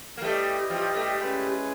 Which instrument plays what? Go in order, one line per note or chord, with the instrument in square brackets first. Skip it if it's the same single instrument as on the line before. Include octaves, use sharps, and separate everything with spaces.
[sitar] A#3
[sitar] G3 A3 [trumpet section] E4 G4 B4 D#5 G5
[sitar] F3 G3
G3 A3
[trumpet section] G#3 C#4 E4 G#4 B4